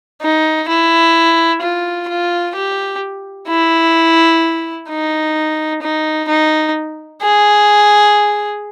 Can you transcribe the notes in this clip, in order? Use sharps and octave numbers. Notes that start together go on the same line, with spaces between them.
D#4
E4
F4
F4
G4
E4
D#4
D#4
D#4
G#4